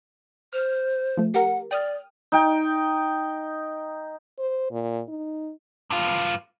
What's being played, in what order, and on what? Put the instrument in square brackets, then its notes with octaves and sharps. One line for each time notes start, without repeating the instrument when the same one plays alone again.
[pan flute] C5 [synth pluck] F6
[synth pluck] F3 A3
[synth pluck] G4 A#4 [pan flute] F#5
[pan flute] D5 [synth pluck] G5 D#6 F6
[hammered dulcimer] D#4 G5
[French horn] C5
A#2
D#4
[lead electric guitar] G2 F4